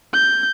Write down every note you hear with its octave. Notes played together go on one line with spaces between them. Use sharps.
G6